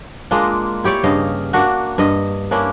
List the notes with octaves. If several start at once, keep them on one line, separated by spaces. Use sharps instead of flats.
G#3 A#3 D4 F4
E4 G4 C#5 D5
G2 C#3 D#5 F5
A#3 D4 F#4
G2 D#5
A#3 C#4 D4 E4